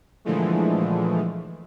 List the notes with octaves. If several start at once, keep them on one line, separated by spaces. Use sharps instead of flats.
A#2 D3 E3 F3 G#3 A3